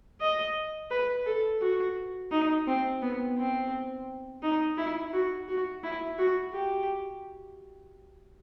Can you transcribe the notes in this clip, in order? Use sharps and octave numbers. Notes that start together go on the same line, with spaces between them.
D#5
B4
A4
F#4
D#4
C4
B3
C4
D#4
E4
F#4
F#4
E4
F#4
G4